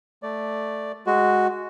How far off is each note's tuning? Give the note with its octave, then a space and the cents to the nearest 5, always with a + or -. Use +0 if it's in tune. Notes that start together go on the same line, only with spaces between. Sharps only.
A3 +0 D5 +0
G#3 +0 F#4 +0